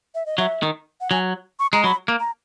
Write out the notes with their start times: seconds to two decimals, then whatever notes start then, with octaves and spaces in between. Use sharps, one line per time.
0.15 E5
0.26 D#5
0.38 F#3 E5
0.63 D#3
1.01 F#5
1.11 F#3 G#5
1.59 C#6
1.73 G#3 A#5
1.84 F#3 B5
2.08 A#3
2.20 A#5